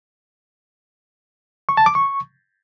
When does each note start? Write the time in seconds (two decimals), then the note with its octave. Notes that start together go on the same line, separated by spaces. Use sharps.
1.69 C#6
1.77 A5
1.86 D6
1.95 C#6